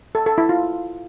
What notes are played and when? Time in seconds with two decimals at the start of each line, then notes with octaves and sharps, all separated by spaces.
0.15 A4
0.26 A4
0.38 E4
0.49 F4